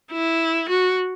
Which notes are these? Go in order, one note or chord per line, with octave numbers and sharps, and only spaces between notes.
E4
F#4